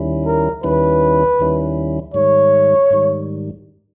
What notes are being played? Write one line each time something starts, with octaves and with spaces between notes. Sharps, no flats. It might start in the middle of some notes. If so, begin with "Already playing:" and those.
Already playing: D#2 D#3 G3 C#4 E4
A#4
D#2 D#3 G3 C#4 E4 B4
D#2 D#3 G3 C#4 E4
G#2 D#3 G3 C#5
G#2 D#3 G3